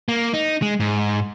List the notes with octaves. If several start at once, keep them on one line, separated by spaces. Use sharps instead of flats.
A#3
D#4
G#3
G#2